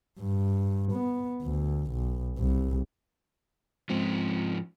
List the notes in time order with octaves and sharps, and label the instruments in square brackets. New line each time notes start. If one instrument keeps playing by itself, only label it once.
[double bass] G2
B3
D2
B1
C2
[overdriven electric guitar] G#2 F3 [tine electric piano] G#3 C4 F4